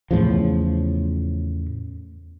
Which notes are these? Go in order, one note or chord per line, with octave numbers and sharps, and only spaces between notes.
E2 A2 C#3 F3